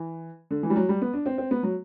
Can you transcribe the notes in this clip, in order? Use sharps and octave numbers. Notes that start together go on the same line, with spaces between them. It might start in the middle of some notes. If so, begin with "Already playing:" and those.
Already playing: E3
D3
E3
G3
F#3
G3
B3
D4
C4
C4
B3
F#3